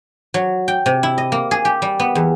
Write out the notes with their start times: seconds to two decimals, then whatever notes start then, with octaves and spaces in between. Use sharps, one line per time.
0.34 F#3
0.68 G5
0.86 C3
1.03 E4
1.18 D#5
1.32 A#3
1.51 G#4
1.65 G4
1.82 G3
2.00 B3
2.15 E2